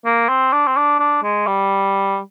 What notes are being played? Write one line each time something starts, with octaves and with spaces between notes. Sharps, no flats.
A#3
C4
D4
C4
D4
D4
G#3
G3